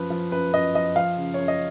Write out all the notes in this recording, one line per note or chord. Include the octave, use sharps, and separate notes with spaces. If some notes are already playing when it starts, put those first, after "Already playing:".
Already playing: F#2 F3 B4
F3
F#2 B4
F#2 D#5
F3 D#5
F3 F5
C#3
F#2 C#5
D#5